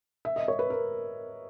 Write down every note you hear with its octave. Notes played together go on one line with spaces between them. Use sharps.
E5
D#5
C#5
B4
A#4